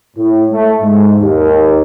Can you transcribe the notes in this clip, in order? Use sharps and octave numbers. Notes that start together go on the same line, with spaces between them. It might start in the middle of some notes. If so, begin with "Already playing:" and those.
A2
A3
G#2
D#2